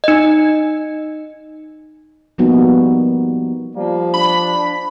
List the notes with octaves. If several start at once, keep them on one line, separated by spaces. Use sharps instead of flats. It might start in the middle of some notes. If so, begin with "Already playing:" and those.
D#4 D#5
F3 G3 A#3 B3 D#4 F#4
F3 G3 A#3
D4 B5